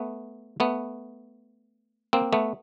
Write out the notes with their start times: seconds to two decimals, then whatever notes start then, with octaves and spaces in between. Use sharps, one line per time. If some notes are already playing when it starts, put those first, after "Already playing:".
Already playing: A3 B3
0.60 A3 B3
2.13 A#3 C4
2.33 A3 B3